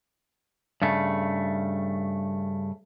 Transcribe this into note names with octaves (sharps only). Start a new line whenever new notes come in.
G2 C#3 A3